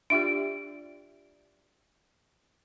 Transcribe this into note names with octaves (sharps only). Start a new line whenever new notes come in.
D4 F4 G4 D5 E5 G5 D7